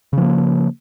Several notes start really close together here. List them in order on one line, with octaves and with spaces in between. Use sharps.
C#3 F3 A#3